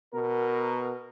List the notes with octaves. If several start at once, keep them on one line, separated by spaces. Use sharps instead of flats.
B2 B3 A#4